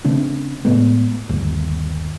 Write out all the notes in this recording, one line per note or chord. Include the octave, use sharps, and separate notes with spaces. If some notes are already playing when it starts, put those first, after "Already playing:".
C#3 A3 C4 D4
A2 G#3 A3 B3
G1 D#2